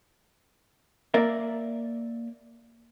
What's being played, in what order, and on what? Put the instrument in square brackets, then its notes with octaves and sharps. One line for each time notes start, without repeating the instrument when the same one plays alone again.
[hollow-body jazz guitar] A#3 A#4 D5 E5